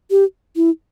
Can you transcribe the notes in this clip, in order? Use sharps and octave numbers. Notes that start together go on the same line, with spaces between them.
G4
E4